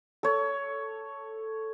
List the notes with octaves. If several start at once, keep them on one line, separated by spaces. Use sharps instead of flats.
A4 C#5